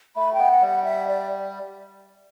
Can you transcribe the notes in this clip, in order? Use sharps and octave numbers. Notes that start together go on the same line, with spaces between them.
A3 B5
G5
B3
F#5
G3
F#5
E5
D5